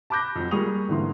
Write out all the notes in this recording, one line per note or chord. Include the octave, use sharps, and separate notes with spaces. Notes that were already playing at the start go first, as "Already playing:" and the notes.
A5 B5 D6 F#6 G6 A#6
F2 F#3
G3 A#3 G#4 C#6 D#6 F7
G#1 D3 E3 A#3 C6